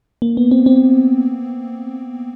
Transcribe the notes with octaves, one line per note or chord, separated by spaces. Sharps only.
A#3
B3
C4
C4